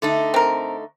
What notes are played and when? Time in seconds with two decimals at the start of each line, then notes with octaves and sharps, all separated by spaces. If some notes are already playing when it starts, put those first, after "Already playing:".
0.02 D3 A3 D#4
0.34 C4 A#4